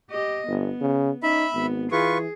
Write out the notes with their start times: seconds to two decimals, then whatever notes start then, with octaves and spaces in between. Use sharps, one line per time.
0.10 G4 D#5
0.47 G1 B3
0.81 C#3
1.23 C#4 D#4 E5 B5
1.54 G#1 B3
1.92 E3 F4 G#4 B4 C#6